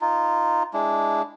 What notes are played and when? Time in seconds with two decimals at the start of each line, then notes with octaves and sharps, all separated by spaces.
0.01 D#4 F4
0.73 G#3 D4 E4